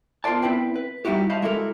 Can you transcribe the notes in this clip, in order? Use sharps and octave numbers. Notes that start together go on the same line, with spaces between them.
B3 F4 A#4 C5 D5 A5
B3 C4 E4 B4 G5
B4
G3 D#4 E4 F#4 G4
C5 D#5 F5 A5 B5
G#3 E4 F#4 G4 A4 A#4